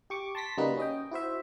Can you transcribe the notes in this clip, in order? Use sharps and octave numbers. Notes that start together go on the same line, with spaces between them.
G4 C#6 D6
A5 C6 A#6 B6
C#3 G3 A#3 D#4 F#4 B4
C#4 D#5 G5
E4 F#4 C5 E5